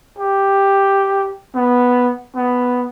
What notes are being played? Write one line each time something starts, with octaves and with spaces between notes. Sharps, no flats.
G4
B3
B3